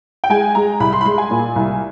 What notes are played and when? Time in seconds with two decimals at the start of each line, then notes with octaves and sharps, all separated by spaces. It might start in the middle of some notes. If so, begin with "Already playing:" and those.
0.24 G5
0.30 G#3 G#5
0.55 G#3 A#5
0.80 C2 B5
0.93 C6
1.01 B5
1.05 G#3 C6
1.18 G#5
1.31 A#2
1.56 C2